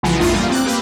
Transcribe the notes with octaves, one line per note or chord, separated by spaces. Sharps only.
B1 C#3 E3 F3 G#3 B3
A1 E2 G2 A3 F4 D#6
G3 A#3
C4 D6 F#6
A#3 G4 B4